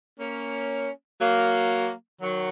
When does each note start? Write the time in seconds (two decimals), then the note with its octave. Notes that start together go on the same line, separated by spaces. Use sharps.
0.19 A#3 C#4
1.19 F#3 A#3
2.20 D#3 F#3